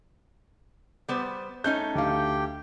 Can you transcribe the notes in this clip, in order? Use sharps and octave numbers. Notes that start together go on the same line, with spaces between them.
G3 B3 C5
A3 C#4 D#4 G6
D2 G4 F5 G5